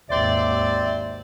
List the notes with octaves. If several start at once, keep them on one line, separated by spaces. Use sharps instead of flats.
G#1 D#2 C4 C5 D5 E5